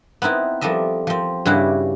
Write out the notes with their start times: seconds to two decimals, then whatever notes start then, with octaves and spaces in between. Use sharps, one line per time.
0.22 B3 C4 D#4 E4
0.61 F3 G3 A4 D#5 E5
1.07 F3 C4
1.45 G2 C#3 G3 C#4 E4 F#4